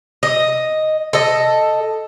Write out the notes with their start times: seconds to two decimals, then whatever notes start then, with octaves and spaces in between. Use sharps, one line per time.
0.23 D#5
1.13 A4 D#5